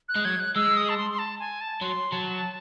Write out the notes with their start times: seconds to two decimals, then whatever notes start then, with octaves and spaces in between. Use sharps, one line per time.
0.09 F#6
0.15 G#3
0.25 F#3 G#6
0.40 F#6
0.55 G#3 E6
0.77 D#6
0.89 A5
0.97 C6
1.11 C6
1.19 A5
1.39 G#5
1.61 A5
1.82 F#3 C6
2.12 F#3 A5